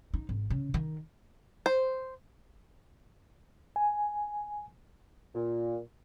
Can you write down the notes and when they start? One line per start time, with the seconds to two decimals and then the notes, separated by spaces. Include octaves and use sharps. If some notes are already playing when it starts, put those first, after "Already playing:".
0.14 D#4
0.29 G#1
0.50 C#3
0.74 D#3
1.66 C5
3.76 G#5
5.35 A#2